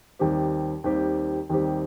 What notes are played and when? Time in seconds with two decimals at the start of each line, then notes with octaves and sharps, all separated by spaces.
0.19 D#2 D#3 G3 C4 G4
0.84 D#2 D#3 G3 C4 G4
1.49 D#2 D#3 G3 C4 G4